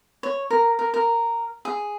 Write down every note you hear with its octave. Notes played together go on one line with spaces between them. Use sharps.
C#5
A#4
A#4
A#4
G#4